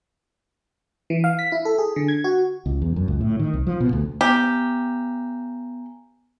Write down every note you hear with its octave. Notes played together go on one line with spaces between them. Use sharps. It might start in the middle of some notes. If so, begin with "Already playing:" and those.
E3
F5
B6
E4
A4
G#4
D3
G#6
F#4
C#2
E2
F#2
C#2
A2
D#3
C2
F3
B2
D2
B3 G4 G#5 A#5